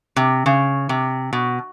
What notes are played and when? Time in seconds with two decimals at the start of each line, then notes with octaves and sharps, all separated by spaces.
0.16 C3
0.46 C#3
0.89 C3
1.33 B2